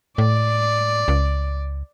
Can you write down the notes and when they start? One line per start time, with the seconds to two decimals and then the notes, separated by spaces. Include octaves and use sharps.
0.18 A2 D5
1.08 C#2